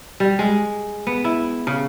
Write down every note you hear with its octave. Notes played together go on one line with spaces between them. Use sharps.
G3
G#3
B3
E4
C#3